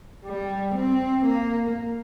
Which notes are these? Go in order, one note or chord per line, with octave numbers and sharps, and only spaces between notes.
G3
C4
A#3